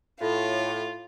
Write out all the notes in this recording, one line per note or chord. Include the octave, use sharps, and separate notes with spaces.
A2 F4